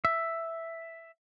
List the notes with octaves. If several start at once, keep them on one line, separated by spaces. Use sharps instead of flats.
E5